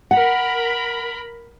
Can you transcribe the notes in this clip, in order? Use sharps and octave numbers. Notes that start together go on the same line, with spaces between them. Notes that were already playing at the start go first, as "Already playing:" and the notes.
A#4 F#5 B5